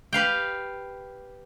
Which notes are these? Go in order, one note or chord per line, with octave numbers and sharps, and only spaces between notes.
G4 B4 F5 G5